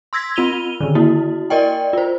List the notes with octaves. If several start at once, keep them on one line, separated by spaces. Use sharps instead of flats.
C6 E6 G#6 A#6 B6
C4 F4 D#7 F7 G7
D3 D#3
A#3 E4 F#4
A#4 D5 D#5 G5
F4 C5